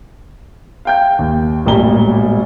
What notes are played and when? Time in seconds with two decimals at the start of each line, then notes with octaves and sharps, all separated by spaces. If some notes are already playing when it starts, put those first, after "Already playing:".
0.85 F5 G5 G6
1.19 D#2
1.66 E1 A1 A#2 G3 A#5 G7